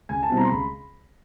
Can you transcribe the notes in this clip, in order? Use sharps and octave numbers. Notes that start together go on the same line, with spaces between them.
C#2 G#5
A5
B2 G3 C4 E4
A#5
C6
C#2 B5